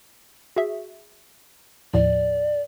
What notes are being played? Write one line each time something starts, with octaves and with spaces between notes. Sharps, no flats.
F#4 G#4 E5
D#2 A2 F3 D5